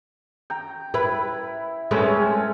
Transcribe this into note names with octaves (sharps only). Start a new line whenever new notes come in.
G5 A#5
E4 B4
G#3 A3 C4 C#4 B4